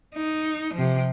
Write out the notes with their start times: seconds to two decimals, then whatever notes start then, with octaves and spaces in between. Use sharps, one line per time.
0.15 D#4
0.74 C3 F3